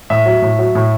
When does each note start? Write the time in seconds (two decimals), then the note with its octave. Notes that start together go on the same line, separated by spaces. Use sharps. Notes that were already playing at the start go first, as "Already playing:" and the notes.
0.10 A2 E5
0.26 F#3
0.42 A2
0.59 F#3
0.75 A2